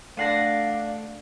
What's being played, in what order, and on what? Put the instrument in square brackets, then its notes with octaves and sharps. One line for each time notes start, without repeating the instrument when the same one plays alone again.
[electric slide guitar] A3 A4 F#5 [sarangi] D4 [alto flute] F5 [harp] A#6 C7 D#7